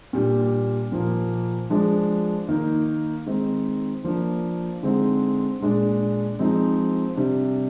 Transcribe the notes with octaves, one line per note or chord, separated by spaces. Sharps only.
A#2 G3 D4
A#2 F3 A#3
F3 G#3 D4
D#3 A#3 D#4
D#3 G#3 C4 D#4
F3 A#3 D4
D3 G#3 C4 D#4
A#2 G#3 D4
F3 G#3 C4 D#4
C3 G3 D4